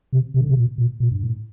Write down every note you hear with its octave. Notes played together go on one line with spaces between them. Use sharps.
C3
C3
D3
C3
A#2
A#2
A#2
G2
A2